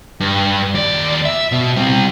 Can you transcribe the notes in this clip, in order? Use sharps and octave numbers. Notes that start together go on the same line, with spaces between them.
G2
D#2 D5
E5
B2
G3 C4